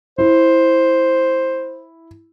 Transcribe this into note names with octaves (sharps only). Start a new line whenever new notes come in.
E4 C5